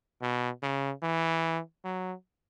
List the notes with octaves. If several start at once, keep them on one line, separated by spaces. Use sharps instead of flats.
B2
C#3
E3
F#3